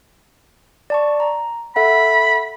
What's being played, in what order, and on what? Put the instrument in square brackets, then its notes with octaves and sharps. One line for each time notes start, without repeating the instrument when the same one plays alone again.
[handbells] D5 A5 C#6
A#5
[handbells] A4 E5 F#5 [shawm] B5